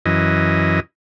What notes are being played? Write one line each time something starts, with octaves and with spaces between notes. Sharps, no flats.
F#2 E3 D#5